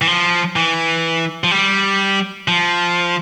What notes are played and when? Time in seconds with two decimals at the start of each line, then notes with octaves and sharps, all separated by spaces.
0.02 E3
0.07 F3
0.56 E3
1.44 F3
1.51 G3
2.48 F3